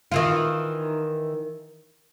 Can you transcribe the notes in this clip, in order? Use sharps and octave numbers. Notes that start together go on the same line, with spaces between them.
D#3 E3 F4